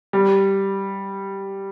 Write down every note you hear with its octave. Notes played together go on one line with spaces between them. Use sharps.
G3